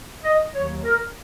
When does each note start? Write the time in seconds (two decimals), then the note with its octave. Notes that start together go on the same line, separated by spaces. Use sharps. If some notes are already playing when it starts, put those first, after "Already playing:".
0.23 D#5
0.53 D#2 D#3 F#3 C#5
0.83 A#4